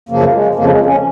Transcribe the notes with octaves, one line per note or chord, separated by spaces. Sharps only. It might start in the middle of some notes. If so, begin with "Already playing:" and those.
F#2 C#3 F3 A#3
G#3
F2 C#3 F3 A#3
G#3
C#4